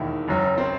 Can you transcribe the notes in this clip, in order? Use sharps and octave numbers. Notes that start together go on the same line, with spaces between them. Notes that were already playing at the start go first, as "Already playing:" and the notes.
Already playing: E1 D#2 D#3 E4 E5
F#1 F#2 F#3
C4 C5